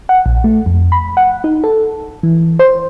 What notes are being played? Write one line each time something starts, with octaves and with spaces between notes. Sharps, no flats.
F#5
A#1
A3
F2
B5
F#5
D#4
A4
E3
C5